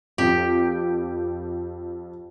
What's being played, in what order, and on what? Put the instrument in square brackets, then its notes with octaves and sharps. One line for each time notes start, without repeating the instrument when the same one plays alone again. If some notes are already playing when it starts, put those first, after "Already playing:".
[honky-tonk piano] F2 [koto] G4